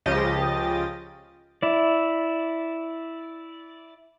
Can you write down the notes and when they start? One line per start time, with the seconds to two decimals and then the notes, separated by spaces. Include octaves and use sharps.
0.06 C#2 C#3 F3 G4 D#5 A6
1.63 E4 D5